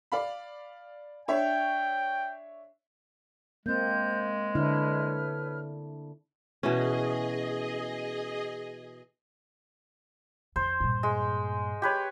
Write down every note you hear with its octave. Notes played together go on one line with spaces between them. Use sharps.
D5 F5 B5
D4 C#5 E5 G5
G#3 A#3 C4 G6
D3 D4 E4 B4 C#5 F6
B2 E3 C#4 G#4 D#5
F2 C5
G2 A#2
G#3
G4 B4 C#5